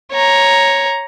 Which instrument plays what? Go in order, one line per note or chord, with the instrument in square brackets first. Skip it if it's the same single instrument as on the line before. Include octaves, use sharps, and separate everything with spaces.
[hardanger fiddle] C#5 A#5